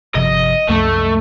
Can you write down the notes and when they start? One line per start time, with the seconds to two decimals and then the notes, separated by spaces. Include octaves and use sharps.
0.15 G1 C3 F3 D#5
0.69 C2 F#2 F3 A3